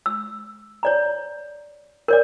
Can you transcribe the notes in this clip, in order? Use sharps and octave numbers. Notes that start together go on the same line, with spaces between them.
E6
C#5 D5 A#5
A#4 C#5 D5